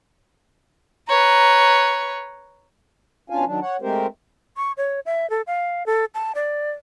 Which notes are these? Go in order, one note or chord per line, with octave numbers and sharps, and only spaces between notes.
B4 C#5 A#5
B2 C#4 D4 F4 F5 G#5
D#3 F#3 D4
C#5 F#5
G#3 A3 C4 G4 A#4 C5
C#6
C#5
E5
A4
F5
A4
A5
D5